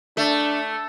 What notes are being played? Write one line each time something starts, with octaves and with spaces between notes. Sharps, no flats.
A3 D4